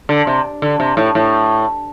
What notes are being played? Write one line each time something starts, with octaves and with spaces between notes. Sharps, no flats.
D3
C3
D3
C3
A2
A2